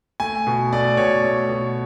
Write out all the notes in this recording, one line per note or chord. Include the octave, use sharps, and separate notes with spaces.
A3 G#5
B2
A3 D5
B2 C#5
A3
B2